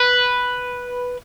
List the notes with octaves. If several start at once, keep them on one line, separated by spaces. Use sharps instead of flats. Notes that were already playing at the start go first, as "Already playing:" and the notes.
Already playing: B4